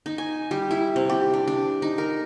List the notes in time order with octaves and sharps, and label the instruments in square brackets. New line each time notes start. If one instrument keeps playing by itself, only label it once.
[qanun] D#4
G#5
G3
E4
C3
G4
D4
D4
D#4
A#4